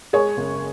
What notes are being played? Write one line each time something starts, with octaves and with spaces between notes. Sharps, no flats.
G#3 G#4 C#5
F#1